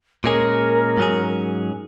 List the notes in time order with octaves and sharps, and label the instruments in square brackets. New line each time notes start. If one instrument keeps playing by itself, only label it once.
[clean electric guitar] A#2 G#3 C#4 G#4 [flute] A#4
[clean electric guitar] G#2 F#3 C#4 G#4